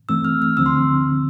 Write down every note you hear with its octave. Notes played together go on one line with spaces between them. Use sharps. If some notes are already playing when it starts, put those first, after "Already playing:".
G2 E3 A3 C4 E6
F6
F6
D2 D3 F3 C4 E6
C6